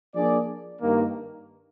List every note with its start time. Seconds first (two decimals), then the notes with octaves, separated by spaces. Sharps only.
0.14 F3 A#3 D4 G#4 D5
0.80 G2 D#3 A#3